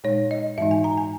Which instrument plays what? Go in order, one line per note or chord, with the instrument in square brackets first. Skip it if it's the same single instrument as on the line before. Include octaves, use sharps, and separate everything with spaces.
[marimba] A#2 G#3 D#4 C#5
D#5
G#2 E3 G#3 D#4 E5
G#5
A#5
G#5